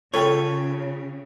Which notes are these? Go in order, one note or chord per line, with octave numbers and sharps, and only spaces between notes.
C#3 F4 A4 B4 C#5 G5